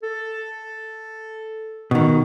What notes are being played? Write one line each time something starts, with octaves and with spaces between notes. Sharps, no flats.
A4
B2 D#3